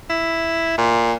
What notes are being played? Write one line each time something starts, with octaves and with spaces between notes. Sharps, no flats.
E4
A#2